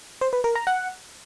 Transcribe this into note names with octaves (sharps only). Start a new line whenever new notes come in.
C5
B4
A#4
A#5
F#5